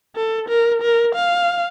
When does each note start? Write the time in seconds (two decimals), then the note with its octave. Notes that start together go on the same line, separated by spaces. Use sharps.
0.16 A4
0.49 A#4
0.82 A#4
1.15 F5